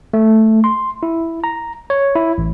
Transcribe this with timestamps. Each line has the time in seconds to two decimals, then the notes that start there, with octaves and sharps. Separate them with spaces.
0.14 A3
0.64 C6
1.03 E4
1.44 A#5
1.90 C#5
2.15 E4
2.38 A1